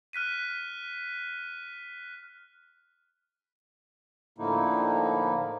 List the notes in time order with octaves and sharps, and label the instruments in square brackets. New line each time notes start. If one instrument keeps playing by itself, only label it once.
[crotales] F6 F#6 B6 D#7
[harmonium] A2 D3 F3 A#3 D#4 E4